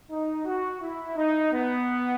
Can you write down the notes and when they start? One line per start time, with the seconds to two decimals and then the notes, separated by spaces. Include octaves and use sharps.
0.10 D#4
0.45 F#4
0.82 E4
1.16 D#4
1.52 B3